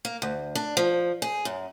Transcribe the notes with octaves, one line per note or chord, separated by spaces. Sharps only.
A#3
D2
D4
F3
G#4
F#2